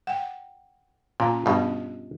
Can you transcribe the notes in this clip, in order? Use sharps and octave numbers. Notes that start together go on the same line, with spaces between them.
F#5 G5
A#2 C#4 F4 A5
G2 B2 C#4 G4 D#5